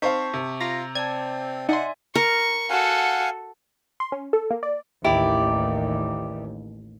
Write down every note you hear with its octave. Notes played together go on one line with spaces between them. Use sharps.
C4 D#4 C5 F5 A5 C#6 B6
C3
F4 A#5 A#6
C4 D5 A5 G#6
D#4 D5 E5 F#5 G#5 C6
A#4 C#6
F#4 A4 F5 F#5 G#5
C6
C#4
A4
A#3
D5
A1 D#2 E4 G4 D5